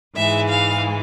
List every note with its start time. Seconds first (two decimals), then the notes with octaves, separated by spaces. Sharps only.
0.15 G#2 E3 G#3 E5
0.48 F5